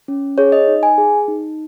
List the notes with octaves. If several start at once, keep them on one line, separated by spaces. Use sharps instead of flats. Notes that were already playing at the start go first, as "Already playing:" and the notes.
C#4
G#4 C#5
D#5
D#4
G#5
G#4
D#4